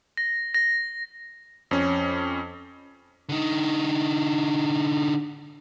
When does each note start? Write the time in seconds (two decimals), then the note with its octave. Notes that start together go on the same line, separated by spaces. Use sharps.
0.17 A#6
0.54 A#6
1.71 F2 C#4
3.29 D3 D#4